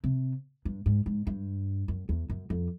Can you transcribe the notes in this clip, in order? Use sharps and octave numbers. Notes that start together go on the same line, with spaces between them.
C3
G2
G#2
G#2
G2
F#2
E2
F#2
F2